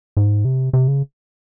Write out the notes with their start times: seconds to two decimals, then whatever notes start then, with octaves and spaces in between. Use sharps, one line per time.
0.17 G#2
0.45 C3
0.73 C3
0.88 C#3